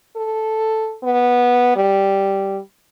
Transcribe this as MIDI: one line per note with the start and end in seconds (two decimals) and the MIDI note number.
0.16 0.95 69
1.03 1.73 59
1.76 2.59 55